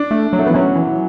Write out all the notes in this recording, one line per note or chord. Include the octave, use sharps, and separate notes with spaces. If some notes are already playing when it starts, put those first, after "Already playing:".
Already playing: D4
A3
F#3
A3
B3
E3
F#3 C#4
E3